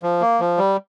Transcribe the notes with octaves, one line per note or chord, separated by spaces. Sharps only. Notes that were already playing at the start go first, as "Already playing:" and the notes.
F3
A#3
F3
G3